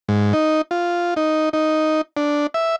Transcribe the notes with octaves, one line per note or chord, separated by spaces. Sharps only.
G#2
D#4
F4
D#4
D#4
D4
E5